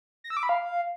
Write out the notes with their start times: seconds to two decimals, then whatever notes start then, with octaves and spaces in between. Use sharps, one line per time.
0.24 A#6
0.30 E6
0.37 D6
0.43 B5
0.49 F5